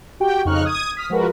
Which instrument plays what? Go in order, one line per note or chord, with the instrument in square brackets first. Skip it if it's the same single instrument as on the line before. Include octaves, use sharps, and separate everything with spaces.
[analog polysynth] F#4 G4 G5
F2 C#3 D#4 C#6 F6 F#6
D#6 G#6 D#7
D#6 F6 B6
F3 G#3 F#4 A#4 B4